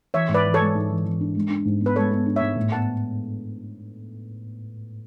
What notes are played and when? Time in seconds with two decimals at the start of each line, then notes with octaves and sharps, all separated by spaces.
0.14 E3 C#5 E5
0.29 G#2
0.34 B4 D5
0.44 E3
0.54 A4 C#5
0.59 G#3
0.75 G#2
0.90 E3
1.05 E3
1.21 D4
1.35 G#3
1.50 D4
1.65 G#2
1.81 B3
1.86 B4
1.96 G#3 A4 C#5
2.11 B3
2.26 D4
2.36 G#2 C#5 E5
2.56 A2
2.72 B3 F#5 A5